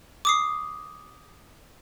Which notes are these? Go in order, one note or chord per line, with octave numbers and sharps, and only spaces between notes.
D6 D#6 C7